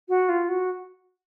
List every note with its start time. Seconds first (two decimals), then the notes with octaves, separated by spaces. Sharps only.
0.08 F#4
0.28 F4
0.48 F#4